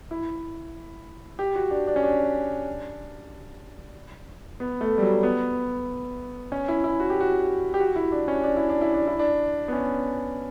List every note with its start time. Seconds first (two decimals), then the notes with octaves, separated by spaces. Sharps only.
0.11 E4
1.39 G4
1.56 F#4
1.71 D4
1.87 D4
1.96 C#4
2.03 D4
4.60 B3
4.81 A3
4.98 G3
5.02 F#3
5.23 B3
6.52 C#4
6.68 E4
6.84 E4
7.00 F#4
7.10 G4
7.21 F#4
7.74 G4
7.80 F#4
7.96 E4
8.12 D4
8.28 C#4
8.44 D4
8.57 E4
8.69 D4
8.81 E4
8.94 D4
9.07 E4
9.19 D4
9.68 B3
9.73 C#4